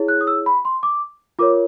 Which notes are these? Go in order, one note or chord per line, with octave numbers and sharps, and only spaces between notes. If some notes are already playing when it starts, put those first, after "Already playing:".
Already playing: E4 G#4 C#5
F#6
D#6
E6
B5
C6
D6
F4 A#4 C#5 D6